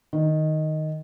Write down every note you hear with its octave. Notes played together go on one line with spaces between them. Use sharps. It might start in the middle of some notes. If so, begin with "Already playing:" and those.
D#3